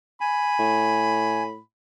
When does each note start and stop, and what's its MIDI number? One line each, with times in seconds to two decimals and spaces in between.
0.21 1.43 80
0.21 1.59 83
0.59 1.58 45